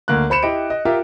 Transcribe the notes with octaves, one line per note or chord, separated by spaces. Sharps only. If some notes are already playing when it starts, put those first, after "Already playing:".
D2 A#3 F#6
C5 B5 C#7 E7
E4 G4 D#5 D7
D#5
F4 G4 A#4 E5